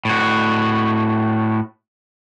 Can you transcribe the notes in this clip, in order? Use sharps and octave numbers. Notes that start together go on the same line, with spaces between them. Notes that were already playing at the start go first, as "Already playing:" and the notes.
A2 F#4